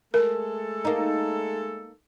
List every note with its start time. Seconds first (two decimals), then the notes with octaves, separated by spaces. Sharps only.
0.14 G#3 A3 A4 A#4
0.85 A#3 D#4